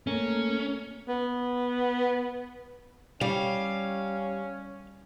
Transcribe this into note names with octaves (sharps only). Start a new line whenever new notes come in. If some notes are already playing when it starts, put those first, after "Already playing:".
A3 A#3 C#4
B3
G3 C#4 F5